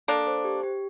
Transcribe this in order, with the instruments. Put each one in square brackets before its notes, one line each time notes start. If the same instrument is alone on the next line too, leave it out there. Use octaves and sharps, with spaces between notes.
[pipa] A#3 D4 [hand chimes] A4
[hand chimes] C5
G4
G4